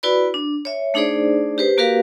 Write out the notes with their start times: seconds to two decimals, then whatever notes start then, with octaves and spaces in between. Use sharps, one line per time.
0.03 E4 F#4 B4 D5 B5
0.34 D4
0.65 C#5 E5
0.94 A3 D4 D#4 G#4 C5 D5
1.58 G4 B4 C5
1.78 A#3 F#4 G4 A#4 B4 F5